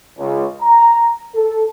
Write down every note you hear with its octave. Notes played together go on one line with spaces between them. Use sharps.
C#2
A#5
A4